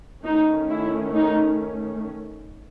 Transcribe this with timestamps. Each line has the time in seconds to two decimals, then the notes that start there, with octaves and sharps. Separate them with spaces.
0.24 D#3 A3 C#4 D#4
0.70 E4
1.15 D#4